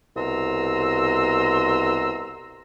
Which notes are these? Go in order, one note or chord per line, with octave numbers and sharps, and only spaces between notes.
C2 B2 A#5 C6 E6